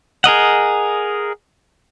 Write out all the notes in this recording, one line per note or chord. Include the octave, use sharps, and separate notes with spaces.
G#4 A#4 D#5 F#5